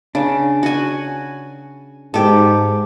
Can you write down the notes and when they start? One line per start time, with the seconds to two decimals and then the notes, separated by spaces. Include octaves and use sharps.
0.15 C#3 D4
0.63 F#4 G#5
2.14 G#2 G4 A4